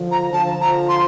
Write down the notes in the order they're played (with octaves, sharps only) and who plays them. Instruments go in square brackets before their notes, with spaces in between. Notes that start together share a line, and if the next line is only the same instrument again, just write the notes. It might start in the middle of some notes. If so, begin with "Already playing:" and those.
Already playing: [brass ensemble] D3 F3
[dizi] A#5
[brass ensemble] D3 F3 [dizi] A5
[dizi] A#5
C6